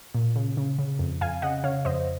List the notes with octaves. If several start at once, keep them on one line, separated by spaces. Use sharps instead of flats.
A#2
C#3
C#3
C#3
F2
F2 F5 G#5
C#3 D#5 F#5
C#3 C#5 F5
F2 C5 D#5